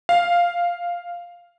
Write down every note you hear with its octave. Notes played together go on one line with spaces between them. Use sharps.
F5